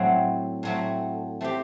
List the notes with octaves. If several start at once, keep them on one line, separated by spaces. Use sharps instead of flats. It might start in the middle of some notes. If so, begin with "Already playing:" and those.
Already playing: A2 F#3 A3 C4 F#4
A2 F#3 A3 C4 F#4
A3 C4 G4